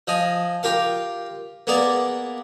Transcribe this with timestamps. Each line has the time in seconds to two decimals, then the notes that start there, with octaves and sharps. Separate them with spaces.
0.07 F3 D#5 G#5
0.63 F4 G4 A#4 F5
1.67 A#3 B3 G#4 A#4 D5